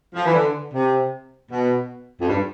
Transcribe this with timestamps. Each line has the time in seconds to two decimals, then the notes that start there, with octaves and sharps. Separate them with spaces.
0.15 F3
0.24 E3
0.33 D3
0.73 C3
1.51 B2
2.20 F2
2.28 G2